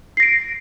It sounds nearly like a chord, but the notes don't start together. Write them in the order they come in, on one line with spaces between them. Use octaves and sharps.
C7 A#6 D7